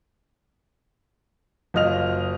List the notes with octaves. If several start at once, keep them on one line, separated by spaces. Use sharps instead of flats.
F#1 F4 D#5 F6 F7